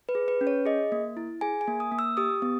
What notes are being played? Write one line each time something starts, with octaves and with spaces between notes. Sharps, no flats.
B4
G#4
B4
C#4
C#5
G#4 D#5
A#3
E4
G#4 G#5
G#5
A#3
D#6
A#3
E6
G4 D#6
B3